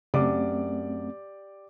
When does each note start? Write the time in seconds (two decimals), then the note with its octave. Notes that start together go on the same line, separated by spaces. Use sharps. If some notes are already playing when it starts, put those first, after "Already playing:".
0.14 F#2 C#3 A3 C4 G4 D5 D6